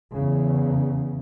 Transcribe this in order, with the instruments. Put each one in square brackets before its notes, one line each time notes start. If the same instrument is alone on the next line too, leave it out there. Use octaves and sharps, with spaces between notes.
[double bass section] E2 C#3